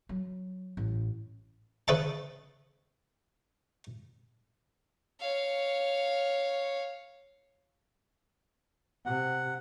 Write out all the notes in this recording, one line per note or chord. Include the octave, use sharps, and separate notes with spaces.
F#3
A1
C#3 B4 E5 A5
C#5 F5
C3 F#5